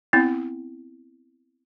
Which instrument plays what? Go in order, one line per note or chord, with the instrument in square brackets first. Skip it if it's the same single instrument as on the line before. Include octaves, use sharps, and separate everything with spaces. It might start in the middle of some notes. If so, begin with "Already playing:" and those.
[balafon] B3 C4 E4